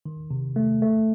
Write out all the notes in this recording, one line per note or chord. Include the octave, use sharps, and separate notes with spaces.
D#3
C3
A3
A3